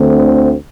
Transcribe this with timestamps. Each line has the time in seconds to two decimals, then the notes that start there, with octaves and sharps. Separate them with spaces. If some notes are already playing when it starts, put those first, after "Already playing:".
Already playing: D2 D3 A3 C4